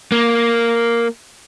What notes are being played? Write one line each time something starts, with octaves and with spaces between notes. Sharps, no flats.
A#3